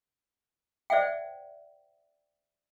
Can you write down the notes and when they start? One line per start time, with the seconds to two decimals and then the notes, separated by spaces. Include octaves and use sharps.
0.90 C5 D5 E5 F#5 G5